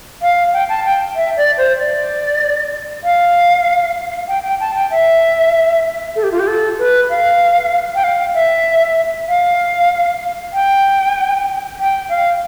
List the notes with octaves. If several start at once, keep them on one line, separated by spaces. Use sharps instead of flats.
F5
G5
A5
G5
E5
D5
C5
D5
F5
G5
G5
A5
G5
E5
A4
G4
F4
G4
A4
B4
F5
G5
F5
E5
F5
G5
G5
F5